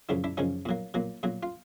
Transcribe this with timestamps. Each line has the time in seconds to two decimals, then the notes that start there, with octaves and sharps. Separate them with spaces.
0.09 F#2 C#3 F3 D4 E4
0.24 D4 E4
0.37 F#2 C#3 F3 C#4 D#4
0.65 A#2 F#3 A#3
0.94 A#2 F#3 A#3
1.23 A#2 F#3 A#3
1.43 F4